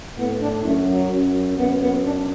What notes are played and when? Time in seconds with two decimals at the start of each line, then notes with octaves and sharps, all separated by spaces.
0.18 A2 B3
0.41 D4
0.64 F#2 A3
0.88 F#3
1.12 F#2
1.57 F#2 B3
1.81 B3
2.04 D4